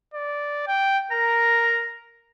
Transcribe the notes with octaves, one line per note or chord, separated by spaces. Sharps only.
D5
G5
A#4 A#5